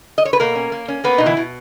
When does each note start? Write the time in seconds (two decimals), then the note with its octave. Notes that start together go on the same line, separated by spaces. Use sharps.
0.18 D#5
0.25 C#5
0.33 B4
0.40 B2 A#3 A#4
0.55 C#4
0.72 A#3
0.88 C#4
1.04 A#3 B3 B4
1.18 B2 D#4
1.26 E3 E4
1.37 B2